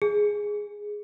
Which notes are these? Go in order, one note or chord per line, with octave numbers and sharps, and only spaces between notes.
G#4